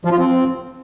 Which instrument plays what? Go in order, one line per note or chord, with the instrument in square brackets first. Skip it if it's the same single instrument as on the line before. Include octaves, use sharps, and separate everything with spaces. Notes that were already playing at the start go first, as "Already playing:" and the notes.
[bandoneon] F3
F4
C4